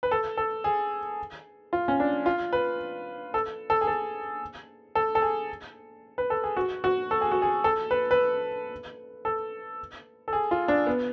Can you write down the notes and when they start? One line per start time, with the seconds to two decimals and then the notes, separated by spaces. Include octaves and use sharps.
0.03 B4
0.11 A4
0.37 A4
0.64 G#4
1.73 F4
1.88 C#4
2.00 D4
2.26 F4
2.53 B4
3.34 A4
3.70 A4
3.81 G#4
3.87 A4
4.95 A4
5.15 A4
5.22 G#4
6.18 B4
6.30 A4
6.44 G#4
6.57 F#4
6.84 F#4
7.11 A4
7.21 G#4
7.32 F#4
7.42 G#4
7.64 A4
7.91 B4
8.11 B4
9.25 A4
10.28 A4
10.33 G#4
10.51 F4
10.68 D4
10.86 B3